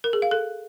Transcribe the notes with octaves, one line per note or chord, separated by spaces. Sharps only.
A#4
G#4
F5
A4